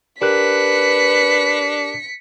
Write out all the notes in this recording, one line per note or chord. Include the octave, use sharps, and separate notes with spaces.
D4 G4 A#4 B4 F#6 B6 C#7